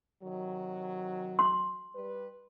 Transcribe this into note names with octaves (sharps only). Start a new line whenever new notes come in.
C3 D#3 F#3
C6
G3 B4